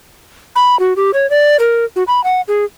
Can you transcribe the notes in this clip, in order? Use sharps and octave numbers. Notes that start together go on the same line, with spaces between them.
B5
F#4
G4
C#5
D5
A#4
F#4
B5
F#5
G#4